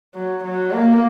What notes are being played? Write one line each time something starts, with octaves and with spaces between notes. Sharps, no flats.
F#3
F#3
A#3